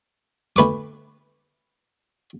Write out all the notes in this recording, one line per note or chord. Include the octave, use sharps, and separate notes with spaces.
D2 B4 C#6 D6